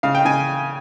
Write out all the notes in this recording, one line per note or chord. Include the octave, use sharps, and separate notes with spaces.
C#3 F5
G5
C#3 G#5